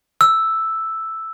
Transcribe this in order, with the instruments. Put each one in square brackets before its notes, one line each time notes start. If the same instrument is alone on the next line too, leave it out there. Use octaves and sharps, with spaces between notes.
[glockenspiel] E6